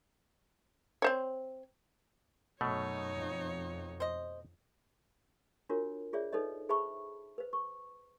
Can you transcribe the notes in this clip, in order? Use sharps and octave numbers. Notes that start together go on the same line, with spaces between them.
C4 C5 C#5
F#2 B2 A3 D#4 C#5
F2
C5 D#5
D4 F4 F#4 A#4 C#5
F4 G#4 C#5 D5 E5
D#4 A4 B4 C#5 D#5
G#4 C5 E5 A5 B5 C#6
B4 C5
C#6